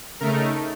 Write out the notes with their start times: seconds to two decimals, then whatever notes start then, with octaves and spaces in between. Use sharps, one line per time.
0.20 C#3 A3 D#4 A#4